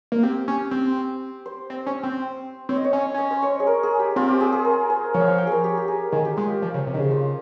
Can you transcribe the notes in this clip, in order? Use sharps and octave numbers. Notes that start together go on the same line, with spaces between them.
A#3
C4 G4
C#4
C4
C5
C4
C#4
C4
C4 C#5
D#5
C#5
C#4
C#4 D#5
C5
C#5
G#4
A#4
G#4
G4
C4 F4
G4
G#4
G#4
A#4
C5
F3 C#5
F5
G5
G5
G#4 A#4
G4
G4
G#4
D#3 G#4
G4
G#3 F4
G4
F3
C#3
C3
D#3
C#3
F4